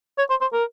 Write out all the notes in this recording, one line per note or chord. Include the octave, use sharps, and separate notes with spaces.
C#5
C5
C5
A#4